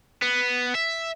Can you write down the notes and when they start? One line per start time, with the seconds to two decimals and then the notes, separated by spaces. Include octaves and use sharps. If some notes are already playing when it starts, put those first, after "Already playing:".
0.22 B3
0.75 E5